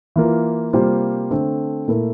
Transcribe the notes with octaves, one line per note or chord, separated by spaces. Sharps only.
E3 A#3 F4 A#4
C3 G3 A#3 F4 C5
D3 A3 C4
A#2 A3 E4 A#4